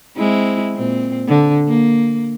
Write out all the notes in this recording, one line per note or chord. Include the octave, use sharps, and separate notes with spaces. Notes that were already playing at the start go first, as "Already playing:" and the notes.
G#3 C4 E4
A#2 C4
D3
A#3